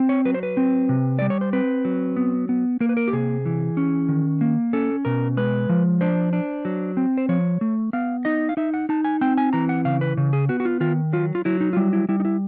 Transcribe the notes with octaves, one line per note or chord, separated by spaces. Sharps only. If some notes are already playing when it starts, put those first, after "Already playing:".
Already playing: C4
C#5
F#3 B4
C5
B4
C4
C3
G3 D5
C#5
C5
C4 B4
F#3
B3
B3
A#3 A#4
B4
A#4
G4
C3 G#4
E3
C#4
D#3
A#3
C#4 A4
B2 A#4
G#3 B4
F3
D4 C5
D4
F#3
C4
C5
F3 C#5
A3
B3 F5
D#4 D#5
F5
D#4 E5
F#5
D#4 A5
G#5
C4 G5
G#5
E3 A#5
F#5
C#3 F5
B4
C#3
G#4
B3 F#4
F#4
F4
D#3 F4
F#3 F4
F4
F#3 E4
D#4
F4
G3 E4
E4
G3 E4
D#4
E4